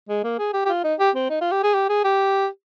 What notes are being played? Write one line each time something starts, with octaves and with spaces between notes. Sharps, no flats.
G#3
A#3
G#4
G4
G4
F4
D#4
G4
C4
D#4
F4
G4
G#4
G4
G#4
G4